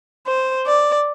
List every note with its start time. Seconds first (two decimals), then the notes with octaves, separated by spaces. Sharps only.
0.27 C5
0.66 D5